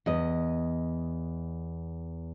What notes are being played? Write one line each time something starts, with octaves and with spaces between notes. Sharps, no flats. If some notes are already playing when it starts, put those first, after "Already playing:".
E2 D#5